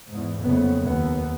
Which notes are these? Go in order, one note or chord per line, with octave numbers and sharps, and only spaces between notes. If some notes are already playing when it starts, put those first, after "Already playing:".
E2 G#2
F#1 F2 C#3 B3
D#2 B3